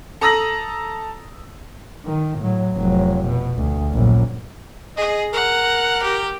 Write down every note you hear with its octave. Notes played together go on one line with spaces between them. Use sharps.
A4 A#5 D#6 E6 A#6 F#7
D#3
A2 F#3
F1 F#3
B2
D2
A#1 F#2
G#4 D#5
A#4 F#5
G4